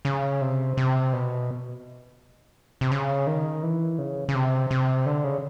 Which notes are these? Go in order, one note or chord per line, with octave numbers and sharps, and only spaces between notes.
C#3
C3
C3
B2
C3
C#3
D#3
E3
C#3
C#3
C3
C3
D3
C#3